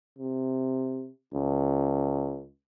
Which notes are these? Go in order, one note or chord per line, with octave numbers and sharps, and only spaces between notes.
C3
C#2